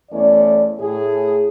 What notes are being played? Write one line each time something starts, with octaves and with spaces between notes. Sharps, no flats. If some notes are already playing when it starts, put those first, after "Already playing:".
E2 A3 C#4 D5
A2 G#4